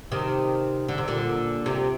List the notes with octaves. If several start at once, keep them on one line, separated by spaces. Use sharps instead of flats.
C3 D#3
D3
C3
A#2 D3
C3